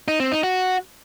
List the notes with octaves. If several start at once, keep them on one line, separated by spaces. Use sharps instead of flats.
D#4
C4
D#4
F#4